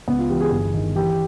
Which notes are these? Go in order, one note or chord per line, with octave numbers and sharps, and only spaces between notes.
C#2 B3
F4
E3 G4
G#4
G1 G#4
D#3
E3 G4